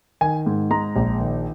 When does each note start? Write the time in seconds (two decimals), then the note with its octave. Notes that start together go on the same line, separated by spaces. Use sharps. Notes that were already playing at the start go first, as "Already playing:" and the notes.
0.21 D#3 G#5
0.46 G#2
0.70 G#3 A#5
0.96 A#1
1.20 D#3